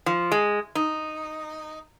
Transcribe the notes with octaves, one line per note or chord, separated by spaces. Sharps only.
F3
G#3
D#4